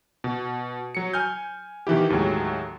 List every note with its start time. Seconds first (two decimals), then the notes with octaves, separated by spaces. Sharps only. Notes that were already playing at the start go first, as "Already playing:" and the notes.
0.24 B2
0.95 F#3 C#7
1.13 G#5 F6 G6
1.87 B2 D#3 E3 E4 G4
2.10 D#2 A2 F#3 G#3